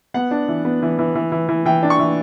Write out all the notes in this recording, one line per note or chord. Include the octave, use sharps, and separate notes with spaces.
B3 F#5
D4
E3
B3
E3
E3
E3
E3
E3
E3 G5
D4
C#6
E3